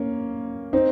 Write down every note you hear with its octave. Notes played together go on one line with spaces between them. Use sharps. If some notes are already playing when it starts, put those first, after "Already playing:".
Already playing: A#3 C#4
C4 D#4